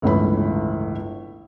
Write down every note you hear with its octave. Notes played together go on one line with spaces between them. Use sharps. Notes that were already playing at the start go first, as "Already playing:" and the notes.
G1 C#2 A2 E3 B4 B5